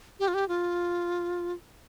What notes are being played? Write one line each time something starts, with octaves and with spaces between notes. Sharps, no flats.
G4
F4
G4
F4